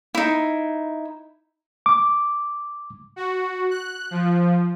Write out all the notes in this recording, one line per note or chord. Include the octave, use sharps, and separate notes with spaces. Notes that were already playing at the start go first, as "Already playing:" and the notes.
D#4 E4
D6
F#4
F#6
F3